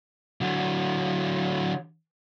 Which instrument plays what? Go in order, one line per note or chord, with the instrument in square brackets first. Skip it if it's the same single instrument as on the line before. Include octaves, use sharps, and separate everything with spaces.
[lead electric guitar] D3 F#3